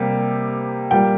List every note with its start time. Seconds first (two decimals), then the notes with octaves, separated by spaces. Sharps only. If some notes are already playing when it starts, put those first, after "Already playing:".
Already playing: C3 G3 A#3 G5
0.91 A#2 G3 A#3 G5